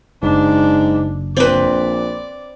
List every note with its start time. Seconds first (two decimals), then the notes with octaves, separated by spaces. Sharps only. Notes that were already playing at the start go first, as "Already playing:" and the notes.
0.23 F#1 G#2 D4
1.37 A#1 C4 B4 D5